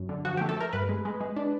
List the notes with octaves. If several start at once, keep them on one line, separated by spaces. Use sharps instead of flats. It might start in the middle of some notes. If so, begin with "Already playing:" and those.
Already playing: F#2
D3
F3 F#4
A3 G4
A4
A3 A#4
G2 B4
G#3
G#3
G#3
D4